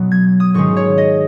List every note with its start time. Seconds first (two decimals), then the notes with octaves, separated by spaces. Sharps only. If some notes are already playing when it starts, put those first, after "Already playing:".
Already playing: B2 F#3 B3
0.11 G#6
0.40 D#6
0.54 G#2 D#3 G#3 C#4 C#6
0.77 C#5
0.98 D#5